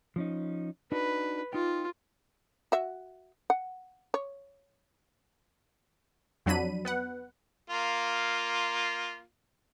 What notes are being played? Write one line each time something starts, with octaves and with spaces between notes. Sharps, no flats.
F3 C#4 D#4
D4 D#4 F#4 B4
D#4 F4 G5
F#4 E5
F#5
C#5
F2 F#3 D4 B5 D#7
B3 B4 F#5
A#3 F4